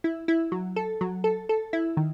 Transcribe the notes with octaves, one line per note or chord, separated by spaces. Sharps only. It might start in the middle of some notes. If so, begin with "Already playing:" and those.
E4
E4
F#3
A4
F#3
A4
A4
E4
D#3